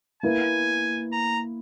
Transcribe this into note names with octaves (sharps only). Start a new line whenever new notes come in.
A#3 E4 B4 G#5
A#5